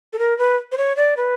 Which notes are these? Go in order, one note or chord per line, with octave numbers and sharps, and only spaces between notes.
A4
A#4
B4
C5
C#5
D5
B4